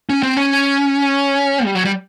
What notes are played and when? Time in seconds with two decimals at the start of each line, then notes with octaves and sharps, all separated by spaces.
0.09 C#4
0.23 C4
0.37 C#4
1.65 G3
1.75 F#3
1.85 G3